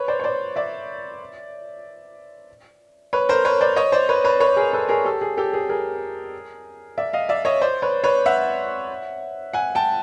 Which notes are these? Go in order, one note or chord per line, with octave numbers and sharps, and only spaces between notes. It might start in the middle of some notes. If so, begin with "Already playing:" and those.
Already playing: B4 C#5
C5 D5
C#5
C5 D5
D5 E5
B4 C#5
A#4 C5
B4 C#5
C5 D5
C#5 D#5
C5 D5
B4 C#5
B4 C#5
B4 C#5
G#4 A#4
A4 B4
G#4 A#4
G4 A4
G#4
G4 A4
G#4
G#4 A#4
D5 E5
D#5 F5
D5 E5
C#5 D#5
C5 D5
B4 C#5
B4 C#5
E5 F#5
F#5 G#5
G5 A5